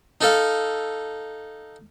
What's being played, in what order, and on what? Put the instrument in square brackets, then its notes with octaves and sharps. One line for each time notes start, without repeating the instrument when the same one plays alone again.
[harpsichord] D#4 A4 F5